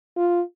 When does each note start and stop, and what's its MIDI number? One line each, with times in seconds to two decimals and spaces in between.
0.17 0.41 65